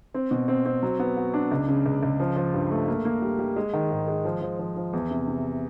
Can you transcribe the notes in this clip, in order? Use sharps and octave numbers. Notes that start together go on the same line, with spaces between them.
C4
B2
C4
C4
F#3
B3
F#4
D4
C#2
C#3
C#2
C#2
F3
F3
G2
A3
A#3
A#3
G3
G3
G#3
D#3
G#2
G#3
F3
F3
F3
F3
E2
C3
C3